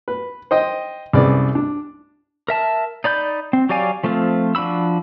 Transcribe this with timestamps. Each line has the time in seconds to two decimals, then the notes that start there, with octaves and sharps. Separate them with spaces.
0.08 B4
0.51 C5 D#5 G5
1.13 C2 F#2 G#4 B4 D5
1.55 D4
2.48 A#4 E5 A5
3.04 D#4 D5 B5 G6
3.53 C4
3.69 F#3 G4 D5 F5 G#5
4.04 F3 A3 C4 F4
4.55 F3 D4 F#4 B5 E6